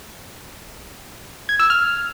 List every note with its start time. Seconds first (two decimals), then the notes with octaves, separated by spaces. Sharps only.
1.49 G#6
1.59 E6
1.70 F6